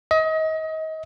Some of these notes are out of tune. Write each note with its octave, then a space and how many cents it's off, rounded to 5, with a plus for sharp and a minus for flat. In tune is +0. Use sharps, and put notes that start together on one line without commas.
D#5 +30